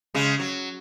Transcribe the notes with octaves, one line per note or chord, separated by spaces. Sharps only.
C#3 G#3
F#3